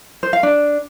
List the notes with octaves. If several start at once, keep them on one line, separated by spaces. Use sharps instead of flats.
C5
F5
D4